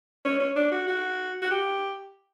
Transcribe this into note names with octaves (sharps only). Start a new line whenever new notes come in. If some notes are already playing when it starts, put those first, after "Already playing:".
C#4
C#4
D4
F#4
F#4
F#4
G4